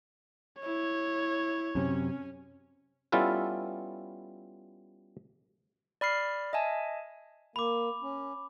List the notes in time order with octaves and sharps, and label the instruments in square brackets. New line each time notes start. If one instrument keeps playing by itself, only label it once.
[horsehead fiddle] E4 [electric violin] C#5
[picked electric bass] F#2 C3 [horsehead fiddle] C#4
[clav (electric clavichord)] G3 B3 C#4 E4 F4 A4
[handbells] D5 B5 F6 C7
D#5 E5 G#5 A5
[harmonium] A#3 [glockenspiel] B5 D6
[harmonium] C#4